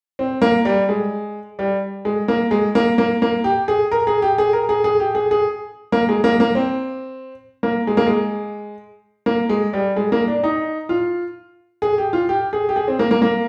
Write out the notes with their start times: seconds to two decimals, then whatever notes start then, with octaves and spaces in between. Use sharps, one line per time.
0.19 C4
0.42 A#3
0.65 G3
0.89 G#3
1.59 G3
2.05 G#3
2.28 A#3
2.51 G#3
2.75 A#3
2.98 A#3
3.22 A#3
3.44 G4
3.68 G#4
3.91 A#4
4.07 G#4
4.22 G4
4.38 G#4
4.53 A#4
4.69 G#4
4.84 G#4
5.00 G4
5.15 G#4
5.31 G#4
5.92 A#3
6.09 G#3
6.24 A#3
6.40 A#3
6.55 C4
7.63 A#3
7.87 G#3
7.97 A#3
8.06 G#3
9.26 A#3
9.49 G#3
9.73 G3
9.96 G#3
10.12 A#3
10.28 D4
10.44 D#4
10.89 F4
11.82 G#4
11.98 G4
12.13 F4
12.29 G4
12.53 G#4
12.69 G4
12.76 G#4
12.88 C4
12.99 A#3
13.11 A#3
13.22 A#3